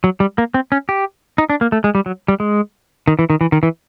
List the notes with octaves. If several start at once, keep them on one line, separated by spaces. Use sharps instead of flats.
F#3
G3
A#3
C4
C#4
G4
D#4
D4
A#3
A3
G#3
G3
F#3
G3
G#3
D#3
E3
D#3
E3
D#3
E3